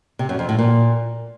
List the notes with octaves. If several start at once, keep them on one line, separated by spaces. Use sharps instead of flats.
C3
F#2
F2
A2
A#2